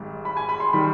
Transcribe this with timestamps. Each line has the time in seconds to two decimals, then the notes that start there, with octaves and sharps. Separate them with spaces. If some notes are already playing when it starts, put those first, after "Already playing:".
Already playing: G#1 G#2 G3
0.25 B5
0.37 G#5
0.49 B5
0.60 C6
0.73 D#3 G3 B5